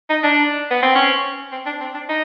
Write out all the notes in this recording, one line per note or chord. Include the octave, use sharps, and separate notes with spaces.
D#4
D4
B3
C4
C#4
C4
D4
C4
D4
D#4